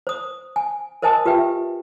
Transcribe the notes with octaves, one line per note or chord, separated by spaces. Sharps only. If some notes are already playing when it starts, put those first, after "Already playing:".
C5 D#6
G#5
A#4 C5 D#5 G#5 A5 D#6
F4 G4 B4 E5 G5